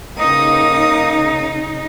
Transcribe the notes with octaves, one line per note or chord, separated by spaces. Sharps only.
C#3 A#3 D#4 D#6